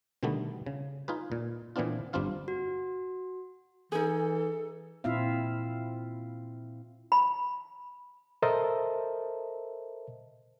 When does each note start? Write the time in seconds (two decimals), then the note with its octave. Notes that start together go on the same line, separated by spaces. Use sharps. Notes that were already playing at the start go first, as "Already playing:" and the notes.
0.23 B2 D3 D#3 G3 A3 B3
0.66 C#3
1.08 D#4 F4 G#4 B4
1.32 A#2
1.76 A#2 E3 B3 C4 D4 F4
2.13 G1 G3 C4 D4 F4 F5
2.48 F#4
3.92 E3 D#4 G#4 A4
5.04 A#2 C4 E4 F4 E5 F5
7.12 B5
8.42 A4 A#4 C5 D#5 E5 A5